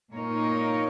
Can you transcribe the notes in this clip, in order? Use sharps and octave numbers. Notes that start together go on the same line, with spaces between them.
A#2 A#3 D#4 A#4 C#5